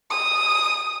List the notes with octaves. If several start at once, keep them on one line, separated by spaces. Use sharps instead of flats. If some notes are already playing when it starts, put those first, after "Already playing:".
D#6